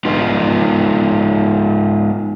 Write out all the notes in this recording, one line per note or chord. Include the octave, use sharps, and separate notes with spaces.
G#3 D#4 F4 B4